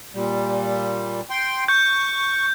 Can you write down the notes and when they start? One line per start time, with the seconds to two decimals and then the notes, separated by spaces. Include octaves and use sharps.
0.15 A#2 G3
1.30 G5 C6
1.68 C#6 G6